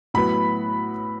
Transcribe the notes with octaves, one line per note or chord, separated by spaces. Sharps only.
A2 F#3 B3 B5